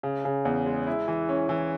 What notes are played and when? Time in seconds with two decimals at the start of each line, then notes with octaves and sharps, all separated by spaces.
0.03 C#3
0.25 C#3
0.45 E2
0.66 G#3
0.87 E4
1.08 E3
1.29 C#4
1.49 E3